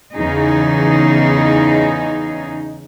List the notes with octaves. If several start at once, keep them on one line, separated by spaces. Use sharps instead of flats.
E2 C#3 D#4 G#4